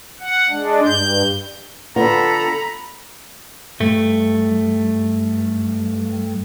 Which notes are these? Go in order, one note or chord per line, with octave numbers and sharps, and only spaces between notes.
F#5
G#3 D4
G2 G6
D3 B3 F4 A4 A#5 B5
G2 A3